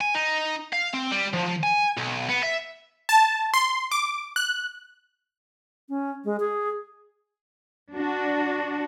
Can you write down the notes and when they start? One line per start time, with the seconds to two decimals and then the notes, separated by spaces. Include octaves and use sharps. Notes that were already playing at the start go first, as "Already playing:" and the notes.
0.01 G#5
0.15 D#4
0.73 F5
0.94 C4
1.12 G3
1.33 F3
1.63 G#5
1.97 B1
2.29 B3
2.43 E5
3.09 A5
3.54 C6
3.91 D6
4.36 F#6
5.89 C#4
6.25 G#3
6.40 G#4
7.93 D4 F#4